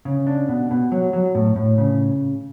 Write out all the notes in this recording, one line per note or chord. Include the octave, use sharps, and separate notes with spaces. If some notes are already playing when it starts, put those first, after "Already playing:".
C#3
D4
B2
B2
F#3
F#3
A2
A2
C#3